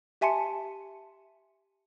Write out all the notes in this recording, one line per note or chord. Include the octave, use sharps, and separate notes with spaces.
G4 E5 G#5 A5 C6 C#7